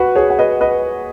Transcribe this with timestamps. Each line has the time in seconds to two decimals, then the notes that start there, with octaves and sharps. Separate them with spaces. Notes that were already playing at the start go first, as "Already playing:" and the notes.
Already playing: F#4 B4
0.16 G#4 C#5
0.30 F#5
0.39 B4 D#5
0.61 B4 D#5